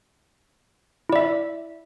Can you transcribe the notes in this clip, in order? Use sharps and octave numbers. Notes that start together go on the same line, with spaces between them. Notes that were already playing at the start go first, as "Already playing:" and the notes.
E4 D5 E5